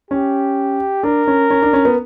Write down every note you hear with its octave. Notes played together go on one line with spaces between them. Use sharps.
C#4 G4
D4 A#4
C#4
C#4
D4
C#4
B3